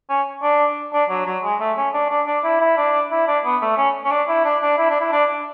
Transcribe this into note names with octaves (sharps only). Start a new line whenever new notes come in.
C#4
D4
D4
F#3
F#3
G#3
A3
C#4
D4
D4
D4
E4
E4
D4
E4
D4
B3
A3
C#4
C#4
D4
E4
D4
D4
E4
D4
E4
D4